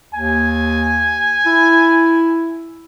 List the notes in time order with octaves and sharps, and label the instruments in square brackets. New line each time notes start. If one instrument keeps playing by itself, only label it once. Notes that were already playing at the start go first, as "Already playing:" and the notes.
[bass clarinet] D#2 [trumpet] G#5
[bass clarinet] E4